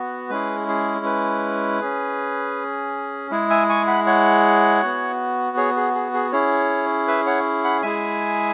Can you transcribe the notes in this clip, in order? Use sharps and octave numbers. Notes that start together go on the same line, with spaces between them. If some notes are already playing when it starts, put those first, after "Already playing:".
Already playing: B3 F#4
G#3 C#4 E4 G#4 B4
G#4
B4
C#4 G#4
G#3 E4 G#4
E5 G#5
G#5 C#6
F#5 B5
C#5 F#5
B3 F#4
G#4 C#5
G#4
G#4
G#4
C#4 E4 G#4 C#5
B4 E5
C#5 F#5
F#5 B5
G#3 E4 G#4 E5 G#5